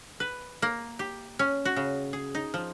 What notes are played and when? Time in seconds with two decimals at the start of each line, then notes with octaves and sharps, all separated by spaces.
0.20 B4
0.62 A#3
0.99 G4
1.39 C#4
1.65 F#4
1.76 C#3
2.13 G#4
2.35 D#4
2.54 F3